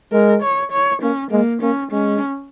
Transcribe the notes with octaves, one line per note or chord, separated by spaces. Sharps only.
G#3 A#4
C#5
C#5
A#3 C#4
G#3 A#3
A#3 C#4
G#3 C#4